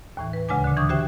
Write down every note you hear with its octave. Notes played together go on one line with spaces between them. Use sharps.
D#2 A2 E3
B4
D2 C#3 G#3 D4 G#5 D6
A#2 D3
E3 D4 C#6 D#6 G6
F#4 G4 C5 E5 G5